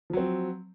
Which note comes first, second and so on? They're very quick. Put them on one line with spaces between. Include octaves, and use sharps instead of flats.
F3 F#3 C4